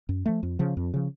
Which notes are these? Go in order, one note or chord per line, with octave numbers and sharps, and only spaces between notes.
F#2
F3 A3
F2
C#3 F3
F2
C#3 F3